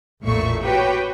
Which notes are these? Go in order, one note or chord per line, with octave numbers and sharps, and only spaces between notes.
A1 E2 A#2 A3 E5 C#6
F#4 G4 B4 C#5 G5